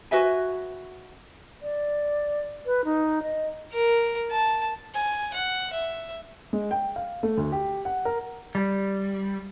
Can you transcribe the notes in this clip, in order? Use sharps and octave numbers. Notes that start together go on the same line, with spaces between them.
F#4 B4 E5 G#5
D5
B4
D#4
D#5
A#4
A5
G#5
F#5
E5
G#3
G5
F5
A3
D2
G4
F#5
A#4
G3